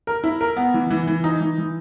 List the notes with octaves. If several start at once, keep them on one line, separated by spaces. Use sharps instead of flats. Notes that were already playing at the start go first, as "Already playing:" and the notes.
A#4
E4
A#4
B3
E3
E3
E3
D#4
E3
E3